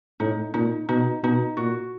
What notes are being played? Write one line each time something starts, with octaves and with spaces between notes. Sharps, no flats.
A2 D#4
A#2 D#4
B2 D#4
B2 D#4
A#2 F#4